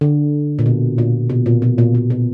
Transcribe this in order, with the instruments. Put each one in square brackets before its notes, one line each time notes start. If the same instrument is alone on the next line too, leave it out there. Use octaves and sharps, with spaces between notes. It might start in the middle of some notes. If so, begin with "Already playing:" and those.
[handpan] D3
A#2
B2
A#2
B2
A#2
B2
A#2
A#2
B2